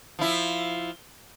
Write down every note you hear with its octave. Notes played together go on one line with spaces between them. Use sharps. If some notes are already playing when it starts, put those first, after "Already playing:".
F3 E4